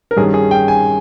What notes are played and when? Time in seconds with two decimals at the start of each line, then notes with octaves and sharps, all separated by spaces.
0.11 A#4
0.17 G2 D#3 G3 C#4 G#4
0.34 G#4
0.51 G5
0.68 G#5